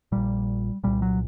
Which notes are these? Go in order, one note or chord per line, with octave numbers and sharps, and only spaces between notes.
A#1 A#2 G3
C2 A#2 G3
F#3